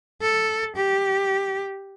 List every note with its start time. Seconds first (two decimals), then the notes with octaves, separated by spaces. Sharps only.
0.21 A4
0.76 G4